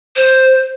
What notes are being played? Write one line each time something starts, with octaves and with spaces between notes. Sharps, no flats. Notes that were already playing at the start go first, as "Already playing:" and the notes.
C5